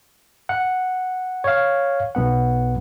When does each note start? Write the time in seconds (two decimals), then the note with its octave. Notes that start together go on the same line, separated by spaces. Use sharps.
0.49 F#5
1.44 C#5 F5
2.15 B1 B3 F#5